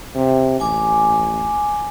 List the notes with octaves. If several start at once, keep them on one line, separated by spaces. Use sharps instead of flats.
C3
A1 G#5 D6